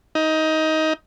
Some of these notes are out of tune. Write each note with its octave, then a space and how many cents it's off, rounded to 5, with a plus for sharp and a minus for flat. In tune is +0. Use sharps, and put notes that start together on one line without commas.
D#4 +15